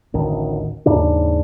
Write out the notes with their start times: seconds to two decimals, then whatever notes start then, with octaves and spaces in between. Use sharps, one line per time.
0.14 A1 D2 D#3
0.86 D#2 G#2 C#3 D4